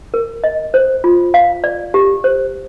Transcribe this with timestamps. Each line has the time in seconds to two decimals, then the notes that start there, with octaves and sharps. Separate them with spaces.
0.14 A#4
0.44 D#5
0.74 C5
1.04 F4
1.34 F5
1.64 D5
1.94 G4
2.24 C5